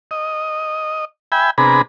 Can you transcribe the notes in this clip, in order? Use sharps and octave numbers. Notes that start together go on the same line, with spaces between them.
D#5
E5 G5 G#5 B5
C3 B3 D4 G#4 A#5 B5